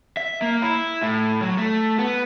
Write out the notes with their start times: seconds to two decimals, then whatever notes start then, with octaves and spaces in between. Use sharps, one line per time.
0.17 E5
0.42 A#3
0.62 E4
1.03 A2
1.43 F#3
1.58 A3
1.99 B3